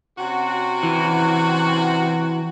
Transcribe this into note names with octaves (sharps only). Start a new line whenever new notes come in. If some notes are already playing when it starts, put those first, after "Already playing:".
C3 C#4 F#4
E3